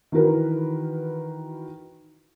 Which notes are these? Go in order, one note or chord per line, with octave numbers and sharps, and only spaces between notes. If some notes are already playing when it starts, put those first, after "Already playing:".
D#3 E3 F#4 A#4 B4